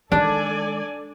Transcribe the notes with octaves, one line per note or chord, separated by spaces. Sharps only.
D#3 G#3 D4 A4 D5 G#5